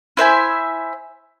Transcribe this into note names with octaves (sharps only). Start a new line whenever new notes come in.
E4 C5 E5 G#5